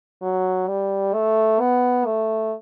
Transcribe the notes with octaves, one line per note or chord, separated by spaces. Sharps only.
F#3
G3
A3
B3
A3